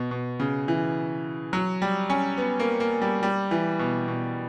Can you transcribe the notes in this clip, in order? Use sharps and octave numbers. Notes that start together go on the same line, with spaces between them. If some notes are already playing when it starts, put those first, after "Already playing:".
Already playing: B2
B2
C#3
E3
F#3
G3
C#4
B3
A#3
A#3
G3
G3
E3
B2
B2